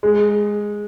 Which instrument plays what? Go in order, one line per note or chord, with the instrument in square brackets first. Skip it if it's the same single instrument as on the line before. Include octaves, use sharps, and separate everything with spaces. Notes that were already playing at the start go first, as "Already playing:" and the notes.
[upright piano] G#3